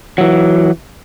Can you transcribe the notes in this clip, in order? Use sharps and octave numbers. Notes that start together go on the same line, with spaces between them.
E3 F#3